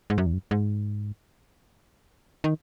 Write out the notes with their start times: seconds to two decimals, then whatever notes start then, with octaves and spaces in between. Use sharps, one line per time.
0.10 G#2
0.18 F#2
0.26 E2
0.33 F#2
0.51 G#2
2.44 D#3